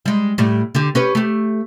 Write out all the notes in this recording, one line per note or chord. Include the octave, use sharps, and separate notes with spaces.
G3 G#3
A2 G3
D3 G4
C#4 G4 B4
A3 G4